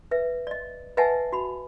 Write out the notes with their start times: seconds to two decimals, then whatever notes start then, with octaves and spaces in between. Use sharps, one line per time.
0.11 B4 E5
0.47 D5 D#5
0.97 B4 D#5 E5 F#5 G#5 A5
1.32 F#4 B5